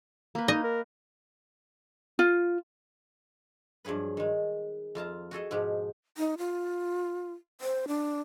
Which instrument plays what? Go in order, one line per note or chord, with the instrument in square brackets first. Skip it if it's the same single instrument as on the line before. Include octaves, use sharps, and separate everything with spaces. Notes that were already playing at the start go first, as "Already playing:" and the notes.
[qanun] A#3 B4
[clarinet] D#4 [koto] D#5
[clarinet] A#4
[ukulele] F4
[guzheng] G2 F3 F#3 G#4 B4
D#3 G#3
F2 F4 A5 A#5
F#4 G#4 A4 D#5
G#2 B2 F3 G#3 G4
[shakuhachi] D#4
F4
C5
D4